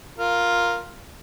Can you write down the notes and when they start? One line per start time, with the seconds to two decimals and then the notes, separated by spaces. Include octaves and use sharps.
0.18 F4 A#4